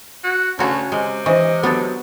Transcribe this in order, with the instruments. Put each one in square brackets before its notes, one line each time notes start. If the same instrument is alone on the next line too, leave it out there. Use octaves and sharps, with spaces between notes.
[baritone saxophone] F#4
[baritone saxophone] D2 [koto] C#3 F#4 [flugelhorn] C#4
[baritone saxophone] C3 [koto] G#3
[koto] E3 [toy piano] D4 C5 C#6 [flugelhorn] D#5
[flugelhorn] F#3 [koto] B3 D4 A4 [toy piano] G4